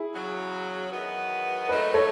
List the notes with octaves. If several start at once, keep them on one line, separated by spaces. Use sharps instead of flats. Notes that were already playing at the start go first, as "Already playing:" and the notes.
Already playing: E4 G#4
E2 C#3 F#3
E2 D#3 F#3 B3
G#2 D#3 F#3 A3 D#4 B4 D#5
A4 C#5